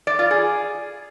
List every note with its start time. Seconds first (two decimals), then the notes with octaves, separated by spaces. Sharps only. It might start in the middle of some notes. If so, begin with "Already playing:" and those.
0.07 D5
0.19 F4
0.31 G#4